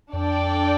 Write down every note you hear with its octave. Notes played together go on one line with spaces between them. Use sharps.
F2 D4 A4 D5 G5